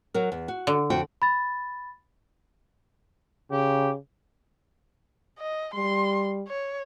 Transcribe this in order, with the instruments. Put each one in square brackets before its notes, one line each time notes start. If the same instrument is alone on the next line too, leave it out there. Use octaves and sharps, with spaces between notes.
[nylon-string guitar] F#3 F#4 A#4
E2
F#4
[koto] D3
[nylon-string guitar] F2 F#4 G5
[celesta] B5 A6
[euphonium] C#3 [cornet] G4
[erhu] D#5
[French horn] G3 [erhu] C6
[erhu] C#5